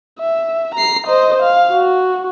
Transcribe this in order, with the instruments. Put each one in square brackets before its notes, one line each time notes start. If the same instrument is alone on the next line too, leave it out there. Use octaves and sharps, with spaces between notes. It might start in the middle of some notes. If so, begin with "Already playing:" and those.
[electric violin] E5
A#5 C7
C5 D#5
F5
F#4